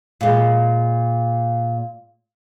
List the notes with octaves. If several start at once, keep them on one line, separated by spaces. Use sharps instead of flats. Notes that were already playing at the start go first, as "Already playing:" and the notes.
A#2 G#3